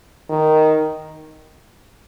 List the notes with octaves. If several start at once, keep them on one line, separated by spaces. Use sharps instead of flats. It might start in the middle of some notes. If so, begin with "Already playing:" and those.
D#3